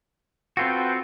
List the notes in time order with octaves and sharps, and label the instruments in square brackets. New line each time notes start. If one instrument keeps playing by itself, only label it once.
[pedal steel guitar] C4 F4 F#4 [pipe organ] A4 B4 G5